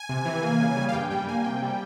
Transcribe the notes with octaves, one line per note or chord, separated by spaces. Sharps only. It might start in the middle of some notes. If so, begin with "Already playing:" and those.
Already playing: G#5
C3
E3
A#3
C#3
G3
F5
G2 G5
G3 G5
A#3 G#5
C3 G5
G3